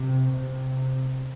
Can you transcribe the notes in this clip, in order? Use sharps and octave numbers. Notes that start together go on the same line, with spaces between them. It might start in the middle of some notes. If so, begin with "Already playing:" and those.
Already playing: C3
C3